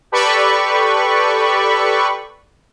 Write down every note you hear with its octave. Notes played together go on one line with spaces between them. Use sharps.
G4 A4 B4 D5 B5 C#6